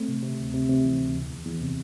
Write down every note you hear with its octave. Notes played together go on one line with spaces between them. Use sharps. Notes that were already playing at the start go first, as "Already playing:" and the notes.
Already playing: A3 C4
C3
C3
D2
C3
C3
E3
D2
E2
E2
E2
C3